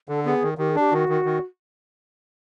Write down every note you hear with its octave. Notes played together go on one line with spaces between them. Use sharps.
D3 A4
B3 G#4
D#3
D#3 G4
G#4
D4 G4
D#3 F#4
D#3
D#3